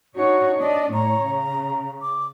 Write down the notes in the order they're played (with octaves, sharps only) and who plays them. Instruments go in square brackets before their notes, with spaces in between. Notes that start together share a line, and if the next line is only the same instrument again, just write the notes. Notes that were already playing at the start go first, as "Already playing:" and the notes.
[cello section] D4 D#4 C#5 [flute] F#4
[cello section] D4 D#5 [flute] D5
[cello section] A2 C#5 [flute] A#5
[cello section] C#3
[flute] D6